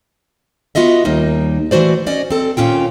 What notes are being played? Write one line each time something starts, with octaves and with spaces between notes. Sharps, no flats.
B3 F4 F#4 D#5 E5
D#2 G3 A#3 D#4
E3 A3 F#4 C5 D5
C#4 D5 D#5
C4 A4
D#2 A#2 C#4 F4 G5